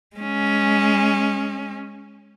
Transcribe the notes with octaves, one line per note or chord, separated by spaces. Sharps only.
G#3 C#4